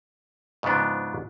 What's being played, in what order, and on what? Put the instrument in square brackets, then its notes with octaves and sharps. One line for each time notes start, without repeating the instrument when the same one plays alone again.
[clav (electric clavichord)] G#2 C#3 F3 B3 D4